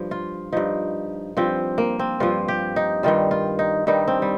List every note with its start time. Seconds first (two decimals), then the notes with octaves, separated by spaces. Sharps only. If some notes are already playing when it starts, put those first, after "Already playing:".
Already playing: G2 F3
0.11 F4
0.53 G2 F3 D#4
1.37 G2 F3 C4
1.78 A#3
1.99 C4
2.20 G2 F3 F4
2.48 G4
2.76 D#4
3.03 G2 D#3 G3 F4
3.31 F4
3.59 D#4
3.87 G2 D#3 G3 D#4
4.08 C4
4.22 G3